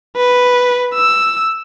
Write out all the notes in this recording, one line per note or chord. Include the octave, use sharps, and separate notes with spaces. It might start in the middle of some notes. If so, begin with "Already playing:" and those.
B4
E6